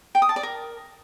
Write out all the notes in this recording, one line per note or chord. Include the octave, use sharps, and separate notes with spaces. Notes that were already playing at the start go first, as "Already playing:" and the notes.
G5
D#6
A5
D5
A#4